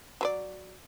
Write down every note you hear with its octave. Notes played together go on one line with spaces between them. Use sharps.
F#3 B4 D5